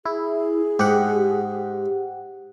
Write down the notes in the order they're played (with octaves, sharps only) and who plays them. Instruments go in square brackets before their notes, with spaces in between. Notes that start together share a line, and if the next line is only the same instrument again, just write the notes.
[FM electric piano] E4 [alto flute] G#4
[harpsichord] G#2 [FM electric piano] G4 F#5